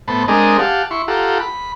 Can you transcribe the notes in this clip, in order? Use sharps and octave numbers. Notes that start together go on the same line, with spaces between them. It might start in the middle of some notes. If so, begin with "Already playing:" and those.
A2 B3 C5 A5 B5
G#3 C4 D4 G#4 A#4 D#5
G4 F5 F#5 A5
E4 C6 C#6
F4 G4 A4 F#5 A#5
B5